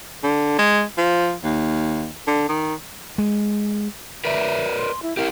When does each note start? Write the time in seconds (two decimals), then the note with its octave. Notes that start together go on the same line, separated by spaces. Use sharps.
0.24 D3
0.58 G#3
0.98 F3
1.44 D#2
2.27 D3
2.49 D#3
3.18 G#3
4.25 A#4 B4 D5 E5
4.78 C6
5.02 E4
5.17 E4 G4 A#4